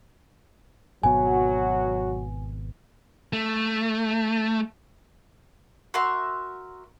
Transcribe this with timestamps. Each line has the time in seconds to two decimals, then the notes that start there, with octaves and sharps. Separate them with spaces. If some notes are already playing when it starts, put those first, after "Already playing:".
1.03 G#1 B2 F#3 B3 F#4 G#5
3.33 A3
5.94 F#4 A#4 E5 C6